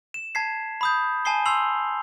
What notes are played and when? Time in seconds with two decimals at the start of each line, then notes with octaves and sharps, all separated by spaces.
0.14 E7
0.35 A5 G#6 B6 C7
0.81 B5 D#6 G6
1.25 G#5 A5 D#6 C7 G7
1.46 G#5 C6 E6 C7 F7 F#7